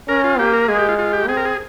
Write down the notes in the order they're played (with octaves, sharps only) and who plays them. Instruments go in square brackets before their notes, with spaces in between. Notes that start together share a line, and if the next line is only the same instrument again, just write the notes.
[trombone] C#4 [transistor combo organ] A#4
[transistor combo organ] F4
[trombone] A#3 [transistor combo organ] G4
[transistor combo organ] A#4
[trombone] G#3 [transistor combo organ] G#4
[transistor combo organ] G4
F4
F4
G4
[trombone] C4 [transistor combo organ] G#4
[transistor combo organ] A#4
G#4